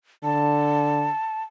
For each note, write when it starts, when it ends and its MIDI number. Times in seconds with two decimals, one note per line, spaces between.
0.24 1.10 50
0.24 1.43 81